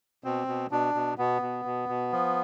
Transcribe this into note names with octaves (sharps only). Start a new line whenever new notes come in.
B2 C4
B2
B2 D4
B2
B2 B3
B2
B2
B2
F3